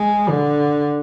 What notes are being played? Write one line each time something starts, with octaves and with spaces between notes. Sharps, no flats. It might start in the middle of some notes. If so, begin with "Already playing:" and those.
Already playing: G#3
D3